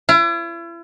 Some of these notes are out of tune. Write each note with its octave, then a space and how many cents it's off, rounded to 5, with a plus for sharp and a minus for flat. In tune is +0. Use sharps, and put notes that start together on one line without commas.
E4 +40